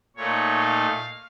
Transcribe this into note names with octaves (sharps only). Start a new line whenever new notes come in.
A#2 A3 D#4 C#5
F5